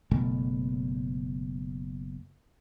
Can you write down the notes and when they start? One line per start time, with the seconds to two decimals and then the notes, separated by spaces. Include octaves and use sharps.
0.11 F#1 B2 A3